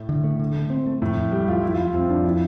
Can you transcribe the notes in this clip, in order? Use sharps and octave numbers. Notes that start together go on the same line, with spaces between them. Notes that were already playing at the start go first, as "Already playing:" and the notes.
Already playing: A2
D3
A3
D3
A3
C4
A3
F2 A2
F2
G3 A3
F2 F4
F2 E4
F4
F2 E4
F2 C4
F2 D4
F3 E4